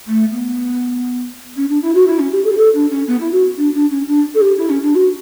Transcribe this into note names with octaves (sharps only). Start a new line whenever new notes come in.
A3
B3
C#4
D4
E4
F#4
E4
C#4
G4
A4
G4
A4
D4
C#4
B3
E4
F#4
D4
D4
C#4
D4
A4
G4
E4
C#4
D4
F#4